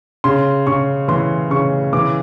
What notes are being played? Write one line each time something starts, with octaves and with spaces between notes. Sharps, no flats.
C#3 C6
C#3 C#6
E3 C6
C#3 C#6
E3 D6